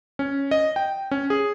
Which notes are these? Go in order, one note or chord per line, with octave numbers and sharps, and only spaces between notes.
C#4
D#5
G5
C#4
G#4